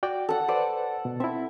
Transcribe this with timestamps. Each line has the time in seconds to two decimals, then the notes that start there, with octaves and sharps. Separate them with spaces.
0.03 F#4 D5 G5
0.29 A4 F#5
0.48 A4 B4 C5 D5
1.05 B2
1.20 C4 E4 E5